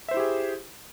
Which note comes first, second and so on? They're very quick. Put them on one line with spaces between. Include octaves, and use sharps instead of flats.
E5 C5 E4 G4 G#4